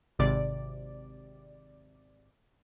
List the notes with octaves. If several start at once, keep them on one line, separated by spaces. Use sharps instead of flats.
G#1 C3 D5